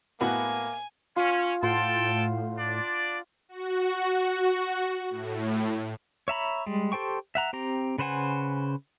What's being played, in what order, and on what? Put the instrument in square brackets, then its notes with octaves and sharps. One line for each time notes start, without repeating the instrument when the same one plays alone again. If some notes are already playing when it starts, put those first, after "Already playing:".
[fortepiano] A2 B3 F#4 [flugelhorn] A#3 [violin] G#5
[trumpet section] C#4 [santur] F4
[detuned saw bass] A2 [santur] F4 C5 F#5 [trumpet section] A4 G5 A5
[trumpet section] D4 D5
[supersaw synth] F#4
A2
[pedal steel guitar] C#5 E5 A#5 B5
G3 G#3
G4 A4 C5 G5 C#6
E5 F#5 A#5
C4 G4 A#5
C#3 B4 C5 F#5 G#5